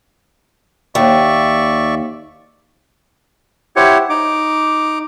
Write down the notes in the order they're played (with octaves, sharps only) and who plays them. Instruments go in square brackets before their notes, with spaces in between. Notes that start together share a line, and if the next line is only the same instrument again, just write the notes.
[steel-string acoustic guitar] D#2 [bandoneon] D5 E5 C#6
[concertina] E4 G4 C5 C#5 F#5
D#4 D6